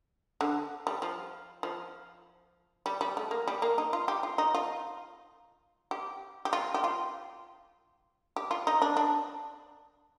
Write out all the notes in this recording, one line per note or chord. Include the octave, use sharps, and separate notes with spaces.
D3
G3
F3
F3
G3
G3
A3
A#3
G3
A#3
D#4
F4
G4
F4
D#4
F4
G4
G4
F4
G4
F4
G4
F4
D#4
D4
D4